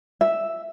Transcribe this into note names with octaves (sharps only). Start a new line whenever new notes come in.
E5